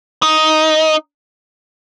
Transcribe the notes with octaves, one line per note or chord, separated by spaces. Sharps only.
D#4